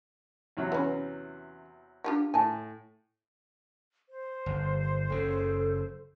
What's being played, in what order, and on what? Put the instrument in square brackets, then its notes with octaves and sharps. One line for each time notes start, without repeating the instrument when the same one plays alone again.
[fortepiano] E2 C3 F#3
[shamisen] E3 C#4
D4 F4 G4
[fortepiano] A2 [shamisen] G#5 A5
[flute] C5
[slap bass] G1
[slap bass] F#1 C#3 [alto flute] A4